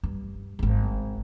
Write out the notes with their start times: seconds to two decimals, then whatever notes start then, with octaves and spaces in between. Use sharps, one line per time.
0.03 G2
0.59 D1 G#1